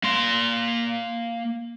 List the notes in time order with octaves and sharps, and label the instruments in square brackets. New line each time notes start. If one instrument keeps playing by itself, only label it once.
[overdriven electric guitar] A#3 C6